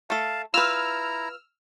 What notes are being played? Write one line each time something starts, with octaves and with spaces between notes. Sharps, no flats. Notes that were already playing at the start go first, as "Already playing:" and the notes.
A3 A4 F5 A5
E4 F4 B4 A#5 E6 F6